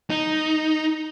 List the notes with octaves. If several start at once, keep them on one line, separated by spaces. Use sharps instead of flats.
D#4